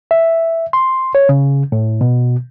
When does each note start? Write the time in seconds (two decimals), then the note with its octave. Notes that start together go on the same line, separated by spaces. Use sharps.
0.11 E5
0.73 C6
1.15 C#5
1.29 C#3
1.72 A2
2.01 B2